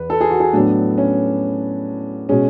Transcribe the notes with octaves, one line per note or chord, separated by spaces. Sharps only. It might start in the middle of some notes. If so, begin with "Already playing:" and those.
Already playing: E2 B4
A4
G#4
F#4
G#4
A2 F#3 B3 D4
C#4
B2 G#3 C#4